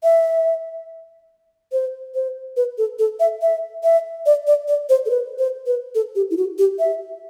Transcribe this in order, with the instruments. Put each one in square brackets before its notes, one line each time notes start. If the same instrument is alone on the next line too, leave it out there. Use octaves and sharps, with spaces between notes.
[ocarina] E5
C5
C5
B4
A4
A4
E5
E5
E5
D5
D5
D5
C5
A4
B4
C5
B4
A4
G4
E4
F#4
G4
E5